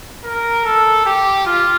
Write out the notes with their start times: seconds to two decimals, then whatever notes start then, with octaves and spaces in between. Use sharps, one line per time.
0.24 A#4
0.65 A4
1.06 G4
1.46 F4